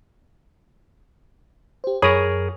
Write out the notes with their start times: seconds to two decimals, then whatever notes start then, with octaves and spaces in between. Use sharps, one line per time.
1.84 G4 C5
2.02 F#2 G#4 A#4 C#5 B5 D#6